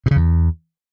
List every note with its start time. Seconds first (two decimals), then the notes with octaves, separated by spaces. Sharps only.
0.06 B2
0.11 C#3
0.16 E2